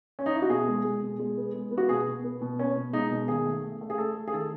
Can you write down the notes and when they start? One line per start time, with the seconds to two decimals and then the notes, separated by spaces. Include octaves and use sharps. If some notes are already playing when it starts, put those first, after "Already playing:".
0.19 C#4
0.26 D#4
0.35 E4
0.42 F#4
0.50 B2 G#4
0.68 G#3
0.85 G#3
1.03 B2
1.20 G#3
1.37 B3
1.54 G#3
1.71 B3
1.78 F#4
1.89 B2 G#4
2.07 B2
2.24 B3
2.42 B2
2.59 B3 C#4
2.77 B2
2.93 G#3 D#4
3.11 B2
3.28 D#3 G#4
3.46 A3
3.64 A3
3.81 A3
3.90 G#4
3.98 A3 A4
4.16 A3
4.28 G#4
4.33 D#3 A4